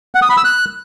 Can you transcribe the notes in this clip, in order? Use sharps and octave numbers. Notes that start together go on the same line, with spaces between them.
F#5
D#6
B5
E6
F#6